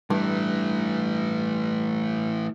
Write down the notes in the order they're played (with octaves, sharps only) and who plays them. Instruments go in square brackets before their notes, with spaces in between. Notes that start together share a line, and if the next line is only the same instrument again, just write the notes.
[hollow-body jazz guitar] G2 [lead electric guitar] E3 A3